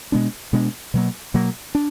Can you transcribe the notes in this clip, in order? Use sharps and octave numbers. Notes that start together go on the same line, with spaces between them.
B2 G#3 B3 D4
B2 G#3 B3 D4
B2 F#3 A#3
B2 F#3 A#3
D4